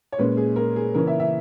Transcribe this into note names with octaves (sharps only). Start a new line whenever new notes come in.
C#5
A#2 G#3 C#4 B4
G#4
A#4
G#4
C#3 E3 A#3 C#4 A#4
E5
E5